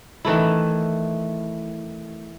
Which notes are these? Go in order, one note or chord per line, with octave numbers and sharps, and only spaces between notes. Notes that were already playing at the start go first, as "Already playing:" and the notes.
D#3 E3 A3 E4